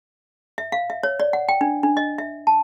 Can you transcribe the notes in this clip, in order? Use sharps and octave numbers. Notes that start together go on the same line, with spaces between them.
E5
F5
E5
C#5
D5
F#5
G5
D4
D4
D#5
E5
A5